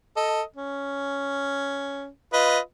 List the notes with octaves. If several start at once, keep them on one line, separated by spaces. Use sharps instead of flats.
A4 D#5
C#4
F4 B4 D#5